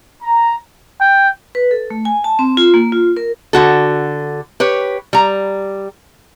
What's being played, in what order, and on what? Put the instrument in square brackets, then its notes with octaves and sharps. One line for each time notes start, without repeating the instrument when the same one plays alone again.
[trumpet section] A#5
[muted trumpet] G5
[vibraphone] B4
A4
A3
G#5
A5
C4
F4
A#3
F4
A#4
[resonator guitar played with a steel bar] D3 F#4 A4
G4 B4 C#5
G3 A#5